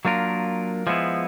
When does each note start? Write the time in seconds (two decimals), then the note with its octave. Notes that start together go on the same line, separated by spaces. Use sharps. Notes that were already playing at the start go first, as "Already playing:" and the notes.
0.05 F#3 A#3 D4 F4 A#4
0.87 F3 G#3 B3 E4